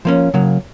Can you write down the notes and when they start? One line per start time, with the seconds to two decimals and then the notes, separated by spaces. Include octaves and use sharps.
0.05 F3 A#3 C#4
0.34 C#3 F#3 A#3